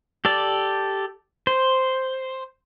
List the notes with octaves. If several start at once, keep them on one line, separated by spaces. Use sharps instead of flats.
G4 A4 D5
C5